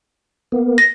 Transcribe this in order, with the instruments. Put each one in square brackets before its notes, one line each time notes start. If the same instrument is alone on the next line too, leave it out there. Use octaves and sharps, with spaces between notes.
[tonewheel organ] A#3 B3
[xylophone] A#6